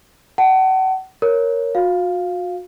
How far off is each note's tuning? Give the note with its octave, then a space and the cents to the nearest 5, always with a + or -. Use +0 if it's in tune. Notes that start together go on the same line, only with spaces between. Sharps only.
F#5 +35 A5 +0
A#4 +0 C#5 +0
F#4 -40 F5 +0